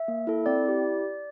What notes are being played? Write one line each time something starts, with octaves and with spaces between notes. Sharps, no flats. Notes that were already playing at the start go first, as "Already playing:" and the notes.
Already playing: E5
A#3
E4 A4
C4 D5
E4 G4